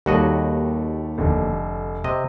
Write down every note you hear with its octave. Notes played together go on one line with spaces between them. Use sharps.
D#2 G3 F#4 A4 C#5 D#5
F1 D3
C3 D#5